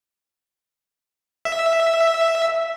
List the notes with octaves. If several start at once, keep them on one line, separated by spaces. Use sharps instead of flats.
E5